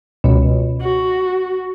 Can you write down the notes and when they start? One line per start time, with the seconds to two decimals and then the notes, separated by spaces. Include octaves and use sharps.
0.24 C#2 B2
0.80 F#4